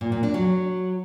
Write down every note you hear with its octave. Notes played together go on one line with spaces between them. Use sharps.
A#2
A#2
D4
F#3